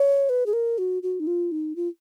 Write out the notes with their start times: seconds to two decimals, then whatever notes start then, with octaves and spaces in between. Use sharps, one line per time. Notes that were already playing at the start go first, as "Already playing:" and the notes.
Already playing: C#5
0.29 B4
0.46 G#4
0.53 A#4
0.78 F#4
1.03 F#4
1.20 D#4
1.27 F4
1.52 D#4
1.76 F4